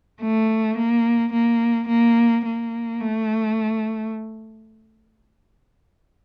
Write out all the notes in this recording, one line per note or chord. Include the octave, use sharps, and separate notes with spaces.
A3
A#3
A#3
A#3
A#3
A3